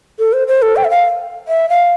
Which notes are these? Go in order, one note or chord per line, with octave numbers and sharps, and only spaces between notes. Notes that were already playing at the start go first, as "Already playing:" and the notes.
A4
C5
C5
A4
G5
E5
F5
E5
F5